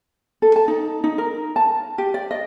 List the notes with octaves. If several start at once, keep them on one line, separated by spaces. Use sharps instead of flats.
A4
A5
D#4
D#4
A#4
A5
G4
D5
D#5